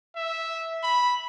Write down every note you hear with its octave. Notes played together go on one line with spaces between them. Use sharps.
E5
B5